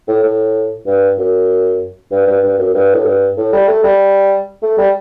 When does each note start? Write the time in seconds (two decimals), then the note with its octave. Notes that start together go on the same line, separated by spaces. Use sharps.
0.08 A2
0.23 A2
0.86 G2
1.18 F#2
2.12 G2
2.27 G2
2.43 G2
2.58 F#2
2.74 G2
2.94 A2
3.05 G2
3.37 A2
3.53 G3
3.68 A3
3.84 G3
4.62 A3
4.78 G3